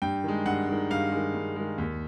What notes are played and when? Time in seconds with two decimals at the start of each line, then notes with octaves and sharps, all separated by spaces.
0.02 G2 G5
0.24 D#3 G#3
0.46 G2 F#5
0.68 D#3 G#3
0.91 G2 F5
1.12 G#3
1.17 D#3
1.35 G2
1.56 D#3 G#3
1.78 D#2